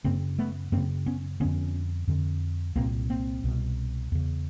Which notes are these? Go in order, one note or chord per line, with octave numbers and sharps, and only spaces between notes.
F#2 C#3 A#3 C4
A3 B3
F#2 C#3 A#3 C4
B3 C#4
F2 D3 B3 C#4
F2 D3
C2 A#2 A#3 C4
A#3 C4
C2 B2
E2 C#3